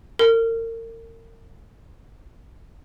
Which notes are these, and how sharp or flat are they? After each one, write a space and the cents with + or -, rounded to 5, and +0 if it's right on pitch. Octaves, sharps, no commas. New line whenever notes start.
A#4 -35